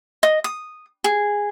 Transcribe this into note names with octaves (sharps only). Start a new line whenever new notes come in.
D#5
D#6
G#4